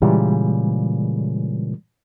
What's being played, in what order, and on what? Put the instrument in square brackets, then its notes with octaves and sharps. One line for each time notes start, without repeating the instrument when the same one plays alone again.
[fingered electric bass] A#2 C#3 [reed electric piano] E3 G3 G#3